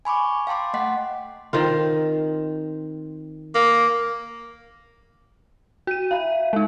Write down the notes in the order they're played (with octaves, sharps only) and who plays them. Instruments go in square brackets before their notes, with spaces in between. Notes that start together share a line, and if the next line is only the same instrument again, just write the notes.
[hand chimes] G#5 B5 C#6 D6
F5 G5 A5 C6 D6
A3 D#5 F#5 C6 B6
[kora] D#3 C4 F4
[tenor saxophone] A#3
[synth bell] F#4 D#7
[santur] E4 A#5 B5 [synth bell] F5
[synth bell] G#3 D#4